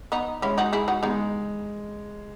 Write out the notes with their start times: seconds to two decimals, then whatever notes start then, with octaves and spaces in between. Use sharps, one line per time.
0.12 B3 D#4
0.42 G#3 C#4 E4
0.58 D#4 F#4
0.73 E4 G#4
0.88 D#4 F#4
1.03 G#3 B3 D#4